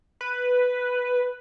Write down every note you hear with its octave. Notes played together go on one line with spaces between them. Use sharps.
B4